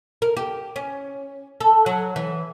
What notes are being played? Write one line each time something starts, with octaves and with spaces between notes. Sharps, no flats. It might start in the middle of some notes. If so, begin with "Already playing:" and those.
A#4
G4
C#4
A4
F#3
E3